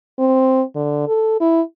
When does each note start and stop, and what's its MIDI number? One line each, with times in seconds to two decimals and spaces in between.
0.19 0.63 60
0.76 1.03 50
1.08 1.37 69
1.40 1.61 64